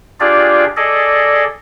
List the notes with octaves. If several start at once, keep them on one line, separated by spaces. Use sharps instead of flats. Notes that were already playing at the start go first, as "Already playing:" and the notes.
D4 F4 G4 G#4 D5
G#4 A4 D5 D#5